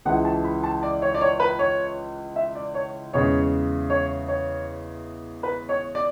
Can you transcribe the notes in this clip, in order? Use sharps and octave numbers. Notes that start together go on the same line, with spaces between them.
C#2 C#3 E3 G#3 F#5
A5
B5
A5
D5
C#5
D5
C#5
B4
C#5
E5
D5
C#5
E2 C#3 G#3 C#4 C#5
C#5
C#5
B4
C#5
D5